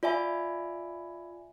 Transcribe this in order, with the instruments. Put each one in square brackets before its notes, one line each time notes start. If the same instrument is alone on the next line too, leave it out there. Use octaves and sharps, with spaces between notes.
[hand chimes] F4 D5 E5 G#5 B5